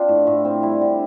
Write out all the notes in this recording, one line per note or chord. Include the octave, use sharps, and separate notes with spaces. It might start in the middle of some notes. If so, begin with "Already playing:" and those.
Already playing: C4 D4 F4
A2
A2
C4
G3 E4
D3